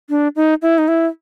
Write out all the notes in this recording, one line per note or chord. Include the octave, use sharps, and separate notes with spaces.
D4
D#4
E4
D#4
E4